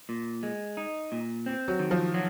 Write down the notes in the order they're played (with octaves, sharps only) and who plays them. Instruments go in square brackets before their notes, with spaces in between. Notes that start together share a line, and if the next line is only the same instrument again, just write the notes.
[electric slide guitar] A#2
G#3
D#4
A#2
C4
[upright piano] F#3
[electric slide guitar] D#3
[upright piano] F3
[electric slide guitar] F#3